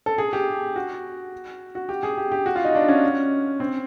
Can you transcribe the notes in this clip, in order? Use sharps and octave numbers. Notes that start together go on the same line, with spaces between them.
A4
G#4
G4
F#4
F#4
G4
G#4
G4
G4
F#4
F4
D#4
D4
C#4
C4